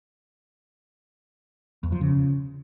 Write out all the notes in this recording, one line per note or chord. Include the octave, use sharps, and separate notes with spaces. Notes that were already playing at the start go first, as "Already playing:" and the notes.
E2
F3
C#3